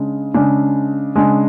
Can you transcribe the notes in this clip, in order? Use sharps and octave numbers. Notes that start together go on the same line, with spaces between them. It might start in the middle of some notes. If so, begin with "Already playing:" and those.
Already playing: C#3 G#3 D4
C#3 G#3 D4
C#3 G#3 D4